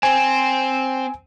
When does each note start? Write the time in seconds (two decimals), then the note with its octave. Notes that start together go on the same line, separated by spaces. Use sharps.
0.03 C4 G#5